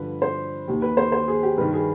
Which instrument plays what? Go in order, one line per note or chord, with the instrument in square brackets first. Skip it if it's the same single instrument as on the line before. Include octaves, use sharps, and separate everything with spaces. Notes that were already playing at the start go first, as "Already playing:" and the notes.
Already playing: [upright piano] G2 D3 F3 B4
C5
D#2 D#3 G4
B4
C5
C5
G#4
G4
G2 D#3 B4
G#4